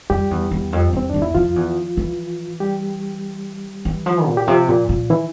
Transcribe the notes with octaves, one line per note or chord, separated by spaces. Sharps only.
F2 G3 G4
E2
E2
F2
E2 C4
E2 D4
E4
F2 F3 F4
E2
E3
G3 G4
E3
F3
A#2
G4
C3 F3 F4
A#2
A#2
E3 E4